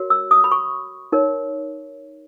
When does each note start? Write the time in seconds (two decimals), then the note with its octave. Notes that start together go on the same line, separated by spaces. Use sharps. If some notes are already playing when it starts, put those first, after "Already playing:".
Already playing: F#4 A#4 C#5
0.10 E6
0.31 D#6
0.44 B5
0.52 C#6
1.12 D#4 A#4 C#5